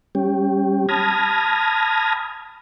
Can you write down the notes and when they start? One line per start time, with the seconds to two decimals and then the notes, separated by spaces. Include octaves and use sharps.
0.15 G3 C#4 G4
0.89 A5 B5 D#6 F6 G#6 A#6